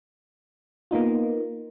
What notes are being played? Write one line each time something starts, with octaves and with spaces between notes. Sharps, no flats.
A#3 B3 D#4 F4